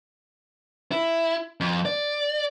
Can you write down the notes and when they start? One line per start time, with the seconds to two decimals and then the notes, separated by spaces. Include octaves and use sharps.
0.92 E4
1.60 F2
1.85 D5